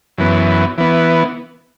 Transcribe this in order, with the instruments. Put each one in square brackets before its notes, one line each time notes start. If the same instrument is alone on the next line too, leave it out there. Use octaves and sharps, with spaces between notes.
[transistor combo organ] F#2 E3 B3
E3 B3